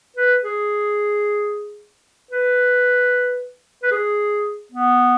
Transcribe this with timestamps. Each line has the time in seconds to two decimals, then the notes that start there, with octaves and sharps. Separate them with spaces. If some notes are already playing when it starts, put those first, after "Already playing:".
0.17 B4
0.43 G#4
2.31 B4
3.83 B4
3.91 G#4
4.72 B3